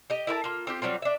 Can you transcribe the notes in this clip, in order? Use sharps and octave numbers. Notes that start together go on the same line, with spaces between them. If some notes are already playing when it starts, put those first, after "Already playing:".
G4 D#5
E4 A#4 B4 A5
A#3 F4
C4 F4 G4
F#3 G3 C4 F4
D4 E5